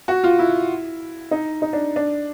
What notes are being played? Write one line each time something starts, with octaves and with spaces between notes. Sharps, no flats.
F#4
F4
E4
D#4
D#4
D4
D4